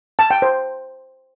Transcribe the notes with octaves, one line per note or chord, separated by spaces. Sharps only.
A5
G5
C5